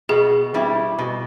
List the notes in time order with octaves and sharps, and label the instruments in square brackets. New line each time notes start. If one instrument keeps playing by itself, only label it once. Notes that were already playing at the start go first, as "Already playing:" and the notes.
[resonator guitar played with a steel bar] B2 [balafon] G#4
[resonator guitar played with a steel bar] G3 C4 E4
B2